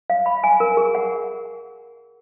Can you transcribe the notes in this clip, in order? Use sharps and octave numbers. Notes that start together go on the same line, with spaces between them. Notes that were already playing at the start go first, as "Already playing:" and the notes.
F5
B5
G#5
A#4
G#4
F#5